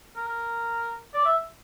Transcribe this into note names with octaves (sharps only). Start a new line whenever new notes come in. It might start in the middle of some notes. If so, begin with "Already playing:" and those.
A#4
A#4
D5
E5